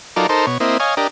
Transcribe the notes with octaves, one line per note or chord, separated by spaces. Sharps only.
F#3 D#4 F4 A4 A#4 D5
D#4 A4 A#4 C5
B2 C#5
A#3 C4 E4 D#5
C#5 D#5 F5 G#5
D4 G4 A#4 D#5